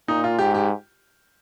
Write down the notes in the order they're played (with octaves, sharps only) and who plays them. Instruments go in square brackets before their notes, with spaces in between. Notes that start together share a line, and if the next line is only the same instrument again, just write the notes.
[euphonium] A#2 [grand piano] D#4
[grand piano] F4
[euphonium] G#2 [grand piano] G4
[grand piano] G4